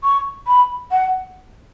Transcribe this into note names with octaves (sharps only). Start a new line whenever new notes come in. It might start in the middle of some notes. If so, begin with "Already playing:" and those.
C#6
B5
F#5